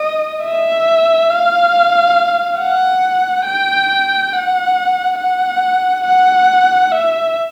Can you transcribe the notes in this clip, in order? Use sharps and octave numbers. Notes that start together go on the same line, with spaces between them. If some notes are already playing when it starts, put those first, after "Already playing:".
Already playing: D#5
E5
F5
F#5
G5
F#5
F#5
F#5
E5